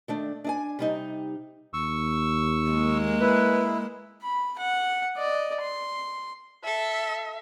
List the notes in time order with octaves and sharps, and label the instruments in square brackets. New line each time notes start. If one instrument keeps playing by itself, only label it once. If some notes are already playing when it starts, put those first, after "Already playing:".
[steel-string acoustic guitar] D#3 A3 D4
D4 D#5 G#5
C3 G3 D#4
[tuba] D#2 [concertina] C#6 E6
[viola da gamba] G#3 A#3
[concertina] E4 [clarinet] B4
[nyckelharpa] B5
F#5
D5 D#5
C6
[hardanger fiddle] A4 [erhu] E5